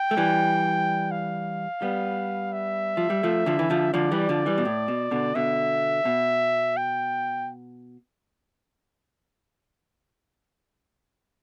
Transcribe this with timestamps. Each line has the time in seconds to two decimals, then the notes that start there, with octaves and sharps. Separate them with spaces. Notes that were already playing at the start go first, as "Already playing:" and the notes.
Already playing: G5
0.11 A3
0.17 E3 G3
1.11 F5
1.82 G3 B3
2.52 E5
2.97 F3
3.10 G3
3.23 F3 A3
3.46 D3 F3
3.59 E3
3.70 D3 F3
3.94 D3 F3 D5
4.12 E3 G3
4.29 D3 F3
4.46 E3 G3
4.58 B2
4.65 A2
4.88 B2
5.11 B2 D3
5.35 B2 D3 E5
6.05 B2
6.77 G5